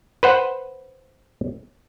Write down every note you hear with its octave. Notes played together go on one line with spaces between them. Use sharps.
B4 C5 F#5